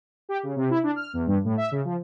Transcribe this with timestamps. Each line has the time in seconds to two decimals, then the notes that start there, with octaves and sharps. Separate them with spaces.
0.29 G4
0.43 C#3
0.56 C3
0.70 E4
0.83 D4
0.96 F6
1.13 E2
1.27 G2
1.44 A2
1.57 E5
1.71 C#3
1.85 F3